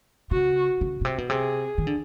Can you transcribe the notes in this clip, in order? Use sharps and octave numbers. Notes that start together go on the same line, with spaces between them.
C#3 F#4
C#3
B2
C3
B2
C3 G#4
D#3
D3